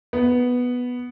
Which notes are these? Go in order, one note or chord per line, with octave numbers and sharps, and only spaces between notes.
B3